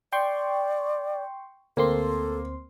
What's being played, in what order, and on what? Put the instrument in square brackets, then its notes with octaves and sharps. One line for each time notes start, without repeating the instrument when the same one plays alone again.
[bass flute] D5 [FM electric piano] G5 C6 C#6
[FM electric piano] D2 C4 C6 [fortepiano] A#3 [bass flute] A4